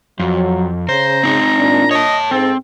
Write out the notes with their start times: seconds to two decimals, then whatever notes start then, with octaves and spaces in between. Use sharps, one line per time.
0.20 F2 F#3
0.89 C#3 C5 A#5
1.23 C4 D#4
1.58 A#2 D4
1.91 C#5 D#5 A5
2.31 G#2 C4 A4